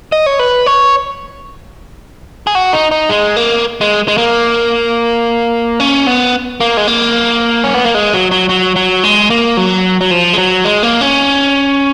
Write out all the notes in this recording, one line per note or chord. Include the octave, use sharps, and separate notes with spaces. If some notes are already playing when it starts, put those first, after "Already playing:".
D#5
C#5
B4
C#5
G#4
F#4
D#4
D#4
G#3
A#3
G#3
G#3
A#3
C#4
B3
A#3
G#3
A#3
C#4
B3
A#3
G#3
F#3
F#3
F#3
F#3
G#3
A#3
F#3
F#3
F3
G#3
F#3
G#3
A#3
C#4